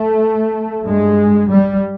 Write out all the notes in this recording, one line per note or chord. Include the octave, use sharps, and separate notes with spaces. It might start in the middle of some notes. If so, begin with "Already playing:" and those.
Already playing: A3
G2 G#3
G3